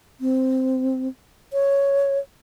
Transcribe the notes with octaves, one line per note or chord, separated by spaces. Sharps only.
C4
C#5